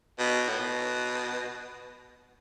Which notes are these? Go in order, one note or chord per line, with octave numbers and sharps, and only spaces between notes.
B2
A2
B2